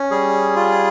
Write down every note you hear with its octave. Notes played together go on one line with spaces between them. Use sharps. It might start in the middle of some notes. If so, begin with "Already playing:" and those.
Already playing: C#4
G3 G#4
F4